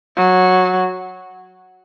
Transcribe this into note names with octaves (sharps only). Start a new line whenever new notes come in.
F#3